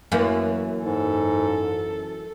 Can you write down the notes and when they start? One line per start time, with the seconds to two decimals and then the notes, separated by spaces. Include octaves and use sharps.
0.12 F#2 E3 A#3
0.84 G#2 A4